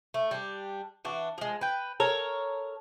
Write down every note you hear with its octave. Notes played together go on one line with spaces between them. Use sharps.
A3
G3 D4
E3 D4 F#4
F3 G#3
B4 G5
A4 A#4 C#5